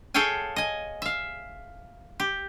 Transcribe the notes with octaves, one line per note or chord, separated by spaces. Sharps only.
G#4 A4 C#5 F5 G5 G#5
D#5 G#5
E5 F5
G4